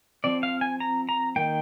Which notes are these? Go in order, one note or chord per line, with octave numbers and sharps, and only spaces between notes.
F3 C4 D5
F5
G#5
A#5
A#5
D#3 A#3 G5